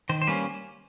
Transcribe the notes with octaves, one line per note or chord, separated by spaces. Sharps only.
D#3 C5
C5
G3 A#3 C#4 B4